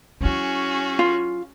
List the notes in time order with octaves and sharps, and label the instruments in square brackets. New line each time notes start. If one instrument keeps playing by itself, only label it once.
[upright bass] F#3 E4 [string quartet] C#4 F#4 G#4
[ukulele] F4